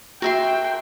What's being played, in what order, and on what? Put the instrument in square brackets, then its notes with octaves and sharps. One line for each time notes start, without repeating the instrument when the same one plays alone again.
[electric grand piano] F#4 [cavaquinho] A#4 E5 C6 [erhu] G5